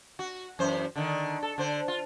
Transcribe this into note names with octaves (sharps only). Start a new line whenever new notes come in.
F#4
F#2 E3 C5
D3 D#3
A4
D3 C5
F4